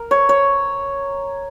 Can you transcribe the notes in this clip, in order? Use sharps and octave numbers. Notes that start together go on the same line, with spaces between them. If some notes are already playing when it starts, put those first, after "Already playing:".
Already playing: A#4
C#5
C#5